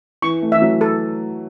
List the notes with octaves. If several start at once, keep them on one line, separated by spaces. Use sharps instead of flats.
E3 C#6
A3
E3 E5
F#3
A4